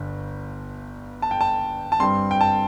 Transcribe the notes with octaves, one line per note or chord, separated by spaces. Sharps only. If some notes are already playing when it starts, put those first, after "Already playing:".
Already playing: G1 G2
A5
G5
A5
A5
G2 G3 C4 C6
G5
A5